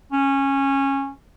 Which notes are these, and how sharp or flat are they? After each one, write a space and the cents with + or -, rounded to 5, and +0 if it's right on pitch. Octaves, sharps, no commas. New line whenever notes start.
C#4 -15